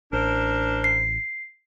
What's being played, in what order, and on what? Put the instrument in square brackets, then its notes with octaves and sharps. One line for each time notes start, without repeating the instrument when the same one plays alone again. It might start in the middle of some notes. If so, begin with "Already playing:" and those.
[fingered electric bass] A1 [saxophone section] D4 A#4 C5
[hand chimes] C7